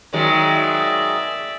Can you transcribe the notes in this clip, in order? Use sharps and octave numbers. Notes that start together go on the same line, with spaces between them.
D#3 F#3 G#3 D5 E5